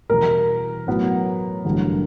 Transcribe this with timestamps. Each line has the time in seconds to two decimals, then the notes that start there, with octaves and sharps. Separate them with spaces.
0.09 E2 B2 G3 A#4
0.87 A2 F#3 B3
1.65 A1 G2 D3 F#3